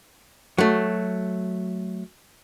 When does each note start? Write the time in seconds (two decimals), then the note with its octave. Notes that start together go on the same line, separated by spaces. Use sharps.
0.58 F#3 A3